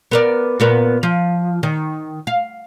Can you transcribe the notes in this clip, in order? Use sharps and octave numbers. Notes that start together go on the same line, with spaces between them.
B3 A#4 D5
A#2 B3 A#4
F3
D#3
F5